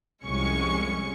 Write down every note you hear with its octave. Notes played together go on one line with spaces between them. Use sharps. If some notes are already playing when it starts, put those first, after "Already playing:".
C2 F2 G#3 C#4 C#6 C#7